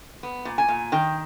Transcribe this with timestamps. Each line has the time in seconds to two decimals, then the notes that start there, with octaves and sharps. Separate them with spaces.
0.23 B3
0.45 A#2
0.58 G#5
0.68 A#2
0.92 D#3 G5